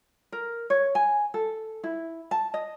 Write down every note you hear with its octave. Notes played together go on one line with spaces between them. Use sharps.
A#4
C#5
G#5
A4
E4
A5
D#5